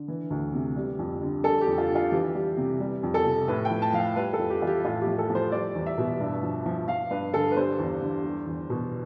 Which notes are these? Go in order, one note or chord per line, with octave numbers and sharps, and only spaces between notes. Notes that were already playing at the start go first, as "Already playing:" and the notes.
Already playing: D3
E3
D2
C3
G3
F2
D3
G3 A4
G4
F2
F4
D3
F4
E3 G4
G3
C3
G3
F2
A4
C3
A2 B4
G5
F3
A5
F3 F5
G5
G3 B4
A4
F2
G4
E3 F4
G4
A2 F4
G4
F3
A4
F3
C5
G3 D5
E2
E5
B2
G2
F3
F3
F3 F5
G2 B4
D3 A4
B4
G3 C5
E2
D3
G3
E2
B2